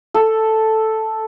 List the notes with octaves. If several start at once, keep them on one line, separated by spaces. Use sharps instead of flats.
A4